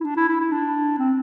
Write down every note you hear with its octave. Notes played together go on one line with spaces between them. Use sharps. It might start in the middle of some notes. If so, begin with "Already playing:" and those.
E4
D4
E4
E4
E4
D4
C4